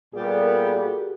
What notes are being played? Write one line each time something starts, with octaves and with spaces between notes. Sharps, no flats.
A#2 G3 B3 G#4
A4
A#4
A4
G#4
G4
F#4
G4